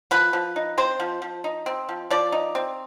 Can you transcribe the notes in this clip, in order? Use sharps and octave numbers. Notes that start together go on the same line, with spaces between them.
F3 B4
F3
D#4
C4 C5
F3
F3
D#4
C4
F3
F3 D5
D#4
C4